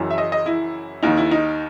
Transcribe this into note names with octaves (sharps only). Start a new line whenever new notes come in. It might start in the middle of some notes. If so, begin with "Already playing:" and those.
Already playing: F#1 F#2 E3
E5
D#5
D#5
E4
D#2 D#3 D#4
E4
D#4